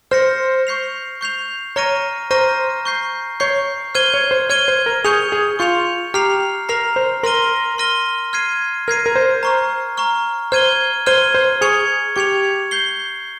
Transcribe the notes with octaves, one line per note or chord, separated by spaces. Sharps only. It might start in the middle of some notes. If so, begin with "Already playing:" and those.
C5 F6 A#6 C#7
C#6 G6 C7 F7
C#6 G6 C7 F7
C#5 A#5 C#6 F6 A#6 D#7
C5 A#5 C#6 F6 A#6 D#7
C#6 G6 C7
C#5 C#6 G6 C7
C5 F6 G#6 D#7 G7
C#5
C5
C#5 F6 G#6 D#7 G7
C5
A#4
G#4 C#6 G6 C#7 F7
G#4
F4 C#6 G6 C#7 F7
G4 A#5 F6 C7 F7
A#4 A#5 F6 C7 F7
C5
A#4 C6 F6 A#6 D#7 G7
C6 F6 A#6 D#7 G7
F6 G#6 C7 D#7
A#4 F6 G#6 C7 D#7
A#4
C5
A#5 C#6 F6
A#5 C#6 F6
C5 F6 G#6 D#7 G7
C5 F6 G#6 D#7 G7
C5
G#4 C#6 G#6 C#7 F7
G4 C#6 G#6 C#7 F7
G6 C7 G7